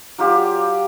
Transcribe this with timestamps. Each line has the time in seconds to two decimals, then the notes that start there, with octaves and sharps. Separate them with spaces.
0.18 F#3 F4 G4 D5